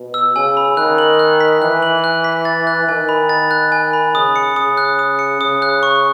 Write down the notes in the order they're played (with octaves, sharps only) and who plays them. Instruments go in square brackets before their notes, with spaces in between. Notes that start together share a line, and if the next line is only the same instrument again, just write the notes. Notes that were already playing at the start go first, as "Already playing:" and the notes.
Already playing: [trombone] B2
[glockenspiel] E6
[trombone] C#3 [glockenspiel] G#5
[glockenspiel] B5
[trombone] D#3 [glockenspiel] F#6
[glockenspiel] F#7
F#6
B6
[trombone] E3 [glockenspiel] F#6
[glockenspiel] F#7
F#6
B6
A6
F#6
[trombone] D#3 [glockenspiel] G#5
[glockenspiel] B5
A6
F#6
G#5
B5
[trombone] C#3 [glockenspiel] D#6
[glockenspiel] C#7
[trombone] C#3 [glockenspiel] D#6
[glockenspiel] F#6
D#6
C#7
[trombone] C#3 [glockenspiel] D#6
[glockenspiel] F#6
C#6